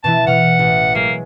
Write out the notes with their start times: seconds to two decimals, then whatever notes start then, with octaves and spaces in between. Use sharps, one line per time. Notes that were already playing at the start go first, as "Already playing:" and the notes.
0.04 B2 E3 E4 A5
0.27 B2 F#5 F6
0.59 A1
0.95 F#3 G#3 A#3